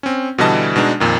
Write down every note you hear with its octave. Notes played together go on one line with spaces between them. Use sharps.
C4 C#4
B2 D3 E3 G3 D#5 A5
B2 G#3 D4 D#4
F2 A#2 D#3